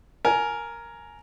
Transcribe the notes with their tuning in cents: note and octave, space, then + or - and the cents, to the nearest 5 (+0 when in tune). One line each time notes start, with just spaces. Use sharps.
A#4 +0 G#5 +20